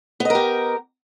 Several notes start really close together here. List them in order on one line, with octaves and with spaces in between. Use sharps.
B3 D#5 A#4 G4